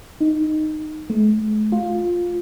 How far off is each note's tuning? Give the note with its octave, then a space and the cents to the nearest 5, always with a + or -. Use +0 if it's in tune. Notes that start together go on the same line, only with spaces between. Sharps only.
D#4 -10
A3 -45
F4 +10